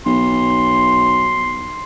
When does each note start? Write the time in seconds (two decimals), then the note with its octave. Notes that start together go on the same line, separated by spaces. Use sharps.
0.06 B1 C6